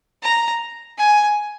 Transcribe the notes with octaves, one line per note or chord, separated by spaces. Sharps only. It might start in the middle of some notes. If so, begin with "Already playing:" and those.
A#5
G#5